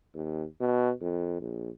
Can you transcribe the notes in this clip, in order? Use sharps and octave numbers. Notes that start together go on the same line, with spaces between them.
D#2
B2
F2
A#1